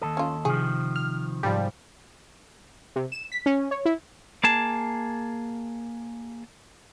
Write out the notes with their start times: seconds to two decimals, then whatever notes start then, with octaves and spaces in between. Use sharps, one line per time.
0.02 D#2 G#2 A4 D#6
0.17 C#4 F4
0.45 C3 D#3 F3 G#4
0.96 F6
1.43 G#2 F3 G3
2.96 C3
3.12 E7
3.32 B6
3.46 C#4
3.71 C#5
3.85 E4
4.44 A#3 G#4 A5